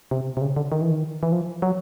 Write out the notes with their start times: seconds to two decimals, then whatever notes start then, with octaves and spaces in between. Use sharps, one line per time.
0.11 C3
0.37 C3
0.41 C#3
0.56 D3
0.72 D#3
0.81 E3
0.91 D#3
1.23 E3
1.32 F3
1.62 F#3